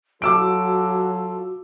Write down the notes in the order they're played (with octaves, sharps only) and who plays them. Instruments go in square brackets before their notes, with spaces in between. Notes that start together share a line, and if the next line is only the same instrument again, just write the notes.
[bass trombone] F#3 [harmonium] F4 A4 [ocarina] F#4 [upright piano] D6 E6 D7